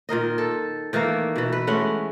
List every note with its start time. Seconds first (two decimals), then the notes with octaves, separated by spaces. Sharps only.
0.09 A#2 D#3 A#4 D#5
0.38 A4
0.93 D#3 E3 A3 A#3
1.36 B2 E3
1.52 B4
1.67 G#3 A3 C#4 F#5